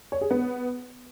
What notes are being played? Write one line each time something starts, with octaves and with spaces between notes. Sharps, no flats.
C#5
G#4
B3